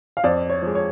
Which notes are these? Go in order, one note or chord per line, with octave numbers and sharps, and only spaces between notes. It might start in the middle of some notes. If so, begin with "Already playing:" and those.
F5
F2 D5
C#5
F3 G#3
C#5